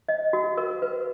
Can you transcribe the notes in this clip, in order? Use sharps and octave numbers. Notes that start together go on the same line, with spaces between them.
D#5
F#4
A#4
B4